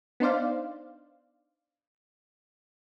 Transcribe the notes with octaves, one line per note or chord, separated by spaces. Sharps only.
B3 D4 D#4 C5 D5 F5